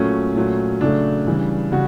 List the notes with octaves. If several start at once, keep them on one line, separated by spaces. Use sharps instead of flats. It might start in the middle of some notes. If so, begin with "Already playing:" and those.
Already playing: A#2 F#3 A3 C#4
A#2 F#3 A3
C#3 F#3 A3 D4
C#3 E3 G3
C#3 G3 F#4